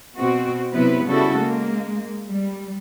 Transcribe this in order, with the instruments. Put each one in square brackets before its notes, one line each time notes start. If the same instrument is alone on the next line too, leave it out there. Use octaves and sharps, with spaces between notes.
[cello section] B2 C4 F#4
C3 F#3 B3 E4 B4
C#3 G3 E4 F#4 A4
G#3 A#3
G3